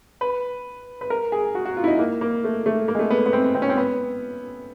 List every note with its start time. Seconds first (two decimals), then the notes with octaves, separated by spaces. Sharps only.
0.21 B4
1.01 B4
1.10 A#4
1.32 G#4
1.55 F#4
1.65 F#4
1.77 F4
1.84 E4
1.88 D#4
1.99 A#3
2.21 A#3
2.44 A3
2.66 A3
2.88 A#3
2.95 G#3
2.99 A3
3.10 B3
3.26 B3
3.33 C4
3.55 C4
3.62 C#4
3.69 C4
3.77 B3